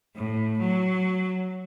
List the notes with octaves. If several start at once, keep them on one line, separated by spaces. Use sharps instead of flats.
A2
F#3